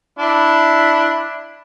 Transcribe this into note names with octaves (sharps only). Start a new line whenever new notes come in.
D4 E4